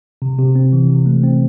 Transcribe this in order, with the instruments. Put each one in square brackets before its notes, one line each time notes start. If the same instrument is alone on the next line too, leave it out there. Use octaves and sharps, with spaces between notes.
[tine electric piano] C3
C3
C4
E3
C3
A3
C4